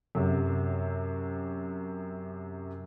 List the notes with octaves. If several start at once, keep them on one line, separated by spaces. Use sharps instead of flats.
F#2 C3